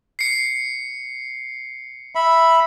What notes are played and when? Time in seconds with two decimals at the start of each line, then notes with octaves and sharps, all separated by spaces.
0.19 C7 C#7
2.15 E5 B5